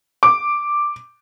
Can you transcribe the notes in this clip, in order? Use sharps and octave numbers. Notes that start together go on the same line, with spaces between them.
D6